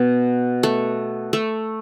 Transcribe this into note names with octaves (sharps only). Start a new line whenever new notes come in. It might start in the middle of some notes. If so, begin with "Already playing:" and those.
Already playing: B2 B3
A3
A3